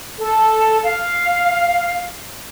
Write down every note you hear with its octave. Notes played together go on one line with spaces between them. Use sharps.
A4
F5